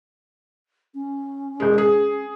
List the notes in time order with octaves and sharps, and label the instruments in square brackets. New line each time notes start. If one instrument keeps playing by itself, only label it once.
[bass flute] C#4
[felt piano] E1 G#3
G#4